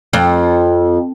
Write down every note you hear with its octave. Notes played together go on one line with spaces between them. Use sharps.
F2